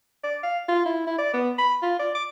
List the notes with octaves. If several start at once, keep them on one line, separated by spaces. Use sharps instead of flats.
D5
F5
F4
E4
E4
D5
B3
B5
F4
D5
D6